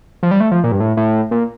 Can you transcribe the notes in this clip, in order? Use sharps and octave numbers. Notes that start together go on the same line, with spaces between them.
F3
G3
A3
F3
A#2
G2
A2
A2
A#2